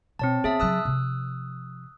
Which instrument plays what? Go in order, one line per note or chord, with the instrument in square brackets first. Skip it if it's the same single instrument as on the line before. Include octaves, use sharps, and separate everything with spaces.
[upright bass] B2 [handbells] C4 C#5 A5
[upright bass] B3 [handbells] G#4 E5 A5
[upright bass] C#3 F#3 [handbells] D#6 E6 F#6
[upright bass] C3 F3